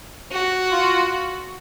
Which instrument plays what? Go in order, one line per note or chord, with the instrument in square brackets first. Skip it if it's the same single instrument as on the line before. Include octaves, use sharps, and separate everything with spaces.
[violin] F#4
[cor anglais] F4